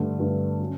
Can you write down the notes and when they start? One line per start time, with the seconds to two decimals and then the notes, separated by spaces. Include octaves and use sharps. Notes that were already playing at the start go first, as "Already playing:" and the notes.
Already playing: G2 D3 A3 D4
0.19 G2 D3 A3 D4
0.60 F#3 C#4